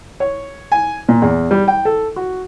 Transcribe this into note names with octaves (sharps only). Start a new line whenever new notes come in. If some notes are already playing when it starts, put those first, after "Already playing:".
C#5
G#5
A#2
E2
G3
G5
A4
F#4